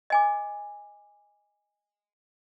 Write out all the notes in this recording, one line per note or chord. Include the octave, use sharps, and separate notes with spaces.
D#5 G#5 D6